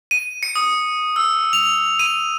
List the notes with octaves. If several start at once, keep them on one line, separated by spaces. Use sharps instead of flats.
D#7
C#7
D#6
E6
F7
D#7